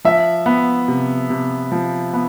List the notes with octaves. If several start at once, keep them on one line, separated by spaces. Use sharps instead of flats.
F3 E5
B3
C3
C3
F3
B3